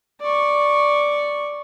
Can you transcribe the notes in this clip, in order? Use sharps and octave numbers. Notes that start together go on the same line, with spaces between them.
D5 C#6